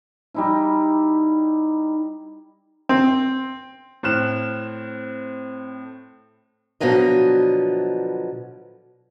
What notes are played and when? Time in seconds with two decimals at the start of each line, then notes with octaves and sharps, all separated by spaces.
0.34 G3 D#4 E4
2.89 C4
4.03 A2 C4 F6 F#6 E7
6.80 B2 D3 F3 F#3 D#5